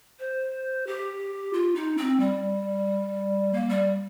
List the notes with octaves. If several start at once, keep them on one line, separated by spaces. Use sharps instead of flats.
C5
G4
F4
D#4
C4
G3
A#3
G3